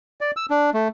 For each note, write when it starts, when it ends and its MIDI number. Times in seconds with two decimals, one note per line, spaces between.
0.21 0.31 74
0.37 0.46 88
0.50 0.70 62
0.74 0.88 57